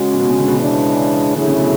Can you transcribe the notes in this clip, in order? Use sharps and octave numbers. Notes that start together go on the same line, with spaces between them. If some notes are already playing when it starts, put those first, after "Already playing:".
Already playing: C#3 G#3 C#4 F#4
C#3
B2
C#3
D3
B2
C#3 E3 G#3 D4
D3 F#3 A3 E4 G#4
C#3
B2